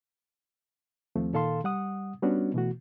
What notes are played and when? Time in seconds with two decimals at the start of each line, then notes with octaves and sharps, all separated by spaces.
1.16 D#2 F3 A3 C4
1.33 A#2 D#3 A4 F5 A5 C6
1.64 G3 F#5 D#6
2.22 G3 B3 C#4 D4 F#4
2.54 B2 E3 A3 F#4